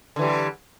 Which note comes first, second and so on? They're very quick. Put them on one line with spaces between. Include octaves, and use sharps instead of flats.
D3 E3 G3